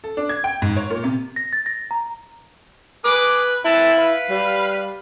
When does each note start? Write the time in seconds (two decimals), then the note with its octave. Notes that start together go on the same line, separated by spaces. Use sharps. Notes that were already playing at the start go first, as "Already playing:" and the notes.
0.04 A4
0.17 D4
0.29 G#6
0.44 G5
0.62 G#2
0.77 C#5
0.90 A#2
1.04 C3
1.36 A#6
1.53 A6
1.66 A#6
1.91 A#5
3.04 G#4 B4 D6
3.65 C4 E4 B4 A5
3.96 B4 F5
4.30 G3